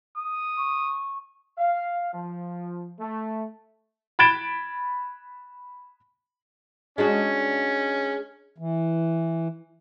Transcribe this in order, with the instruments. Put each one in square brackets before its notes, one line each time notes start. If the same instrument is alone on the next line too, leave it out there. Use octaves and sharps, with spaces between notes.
[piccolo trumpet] D#6
[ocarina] C#6
[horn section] F5
F3
A3
[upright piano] B5 G#6 A6 D7 E7 G7
[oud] G#3 D4 F#4 [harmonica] C#4
[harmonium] E3